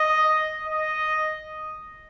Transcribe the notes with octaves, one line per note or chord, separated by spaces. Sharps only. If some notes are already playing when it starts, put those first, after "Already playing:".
Already playing: D#5
D#5